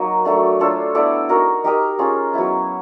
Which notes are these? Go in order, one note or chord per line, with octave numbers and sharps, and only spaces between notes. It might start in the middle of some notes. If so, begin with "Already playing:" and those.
Already playing: F#3 A#3 D#4
F#3 A3 D4
D4 F4 A4 C#5
B3 E4 A4 D5
D#4 F#4 A#4 D#5
D#4 G4 A#4 D#5
C#4 F4 G#4
F#3 B3 E4